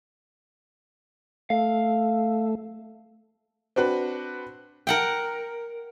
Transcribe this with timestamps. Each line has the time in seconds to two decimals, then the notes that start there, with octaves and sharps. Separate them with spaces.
1.50 A3 F5
3.76 C4 D4 F#4 B4
4.87 A#4 F#5 G5